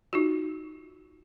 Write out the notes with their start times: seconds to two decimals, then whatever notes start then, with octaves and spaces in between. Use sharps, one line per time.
0.13 D#4 F4 F#4